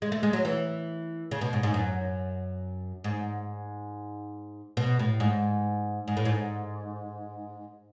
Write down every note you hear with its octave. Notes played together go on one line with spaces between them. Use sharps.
G#3
A3
G#3
F#3
E3
C#3
B2
G#2
G#2
F#2
G#2
B2
A2
G#2
G#2
A2
G#2